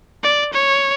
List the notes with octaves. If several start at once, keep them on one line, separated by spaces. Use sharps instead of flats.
D5
C#5